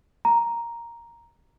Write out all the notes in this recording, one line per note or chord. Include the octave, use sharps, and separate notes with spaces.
A#5